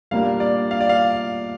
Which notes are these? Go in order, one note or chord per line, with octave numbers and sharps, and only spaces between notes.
A#2 G3 A#3 D4 F5
D5
F5
D5
F5